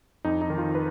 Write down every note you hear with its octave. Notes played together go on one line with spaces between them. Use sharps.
F2 D#4
D#4
D#3
F4
B4